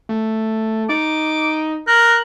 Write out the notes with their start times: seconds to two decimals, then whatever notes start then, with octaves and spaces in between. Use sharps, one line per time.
0.09 A3
0.89 D#4 D6
1.87 A#4 F#6